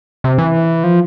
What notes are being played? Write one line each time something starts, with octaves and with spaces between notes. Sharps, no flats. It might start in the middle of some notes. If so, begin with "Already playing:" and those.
C3
E3
F3